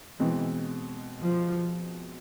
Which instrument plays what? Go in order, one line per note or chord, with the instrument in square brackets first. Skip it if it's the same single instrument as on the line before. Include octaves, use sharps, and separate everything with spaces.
[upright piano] B2 G#3 C4 [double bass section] E3
[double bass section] F3